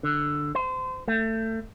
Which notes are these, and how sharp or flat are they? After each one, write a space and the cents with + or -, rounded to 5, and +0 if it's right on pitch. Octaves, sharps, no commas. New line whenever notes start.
D3 +5
C5 -30
A3 +25